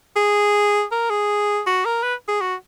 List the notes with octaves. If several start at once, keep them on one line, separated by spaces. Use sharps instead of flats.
G#4
A#4
G#4
F#4
A#4
B4
G#4
F#4